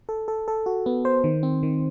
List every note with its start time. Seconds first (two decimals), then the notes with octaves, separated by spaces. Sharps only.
0.09 A4
0.28 A4
0.48 A4
0.66 F#4
0.86 B3
1.05 C5
1.24 D#3
1.43 C4
1.63 D#3